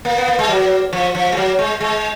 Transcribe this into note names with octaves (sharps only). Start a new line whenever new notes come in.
A#3
B3
A#3
G#3
F#3
F3
F3
G#3
F#3
G#3
G#3